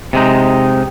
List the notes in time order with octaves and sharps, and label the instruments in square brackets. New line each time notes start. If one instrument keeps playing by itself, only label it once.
[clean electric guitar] C3 G#3 D#4